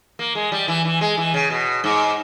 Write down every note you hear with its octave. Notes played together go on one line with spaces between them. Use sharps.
A#3
G#3
G3
E3
E3
G#3
E3
C#3
B2
G#2